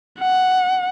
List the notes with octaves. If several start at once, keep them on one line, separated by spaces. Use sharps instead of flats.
F#5